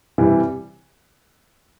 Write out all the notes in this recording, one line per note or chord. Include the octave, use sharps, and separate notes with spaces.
C3 E3 G3